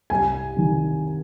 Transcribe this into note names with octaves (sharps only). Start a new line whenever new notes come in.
C2 G#5
C3 D#3